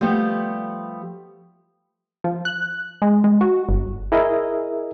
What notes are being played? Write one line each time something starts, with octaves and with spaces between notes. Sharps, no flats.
F3 G3 A3 B3 G4
F3
F#6
G#3
G#3
F#4
G1
E4 G#4 A#4 D#5 E5